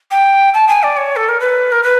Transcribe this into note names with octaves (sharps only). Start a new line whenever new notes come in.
G5
A5
G#5
D5
C#5
A4
A#4
B4
A#4
B4